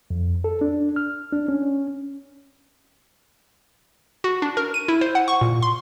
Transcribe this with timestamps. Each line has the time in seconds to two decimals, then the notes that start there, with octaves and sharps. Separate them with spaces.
0.10 F2
0.44 A4
0.61 D4
0.96 F6
1.32 D4
1.48 C#4
4.24 F#4
4.42 D4
4.57 A#4
4.74 D#7
4.88 E4
5.01 C5
5.15 F#5
5.28 C#6
5.41 A#2
5.62 C6